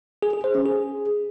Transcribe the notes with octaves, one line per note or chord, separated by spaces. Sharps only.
G#4
G#4
C5
C#4
G#4